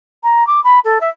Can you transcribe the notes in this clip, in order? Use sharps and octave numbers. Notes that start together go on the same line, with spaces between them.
A#5
D6
B5
A4
E5